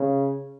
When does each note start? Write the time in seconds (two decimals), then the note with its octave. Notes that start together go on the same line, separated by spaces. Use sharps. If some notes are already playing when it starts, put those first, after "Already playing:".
Already playing: C#3